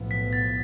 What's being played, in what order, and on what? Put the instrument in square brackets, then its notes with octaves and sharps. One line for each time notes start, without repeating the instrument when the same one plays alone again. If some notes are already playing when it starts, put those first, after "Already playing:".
Already playing: [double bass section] B1 A2 F3 B3
[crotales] B6
A6